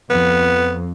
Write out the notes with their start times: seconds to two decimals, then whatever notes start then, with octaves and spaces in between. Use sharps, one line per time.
0.10 F2 B3